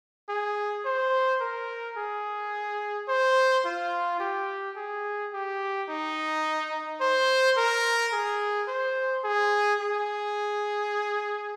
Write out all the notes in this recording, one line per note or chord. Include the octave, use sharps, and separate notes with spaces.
G#4
C5
A#4
G#4
C5
F4
G4
G#4
G4
D#4
C5
A#4
G#4
C5
G#4
G#4